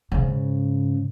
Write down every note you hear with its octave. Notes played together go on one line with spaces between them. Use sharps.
G#2 C#3